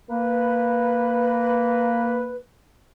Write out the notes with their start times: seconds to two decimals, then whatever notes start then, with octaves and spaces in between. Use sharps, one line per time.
0.10 A#3 B4